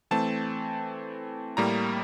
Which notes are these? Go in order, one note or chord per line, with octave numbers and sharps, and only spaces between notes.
E3 A3 C4 A5
A2 G3 A#3 A#5